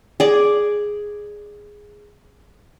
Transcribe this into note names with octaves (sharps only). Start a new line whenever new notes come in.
G#4 D5